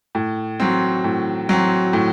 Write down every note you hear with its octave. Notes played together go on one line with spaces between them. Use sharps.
A2
F#3 C4
A2
F#3 C4
A2